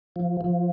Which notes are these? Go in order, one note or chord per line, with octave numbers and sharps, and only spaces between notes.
F3
F3